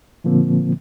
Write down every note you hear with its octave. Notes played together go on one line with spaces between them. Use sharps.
A#2 D3 F3 A#3 C4